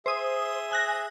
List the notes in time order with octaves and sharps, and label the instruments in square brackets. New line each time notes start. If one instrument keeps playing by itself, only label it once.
[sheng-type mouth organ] G#4 E5 [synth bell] C5 D#6
[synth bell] G#5 F#6 A#6